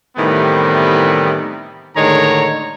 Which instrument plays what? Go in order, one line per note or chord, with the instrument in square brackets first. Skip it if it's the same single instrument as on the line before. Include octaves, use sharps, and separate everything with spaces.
[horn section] A2 C3 D#3 E3 G3 B3
A2 D3 D#3 G#3 C#5 A#5